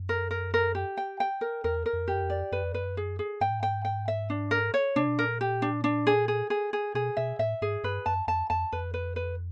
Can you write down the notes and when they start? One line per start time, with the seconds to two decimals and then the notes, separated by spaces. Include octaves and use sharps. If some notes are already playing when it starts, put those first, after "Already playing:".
Already playing: F#2
0.09 A#4
0.31 A#4
0.54 A#4
0.75 G4
0.97 G5
1.20 G5
1.41 A#4
1.64 E2 A#4
1.86 A#4
1.93 F2
2.08 G4
2.14 F#2
2.22 F2
2.30 D5
2.52 F#2 B4
2.62 F2
2.72 F#2 B4
2.97 G#4
3.19 G#4
3.41 G#2 G5
3.50 A2
3.60 G#2 G5
3.85 G5
4.08 E5
4.30 D4
4.51 A#4
4.74 C#5
4.96 C3 D4
5.07 B2
5.19 A#2 A#4
5.41 G4
5.62 D4
5.84 D4
6.07 G#4
6.28 G#4
6.50 G#4
6.73 G#4
6.94 B2 G#4
7.17 B2 E5
7.39 A2 E5
7.61 G#2 G#4
7.83 G2 B4
8.06 F#2 A5
8.27 F2 A5
8.50 F2 A5
8.72 F2 B4
8.94 B4
9.16 B4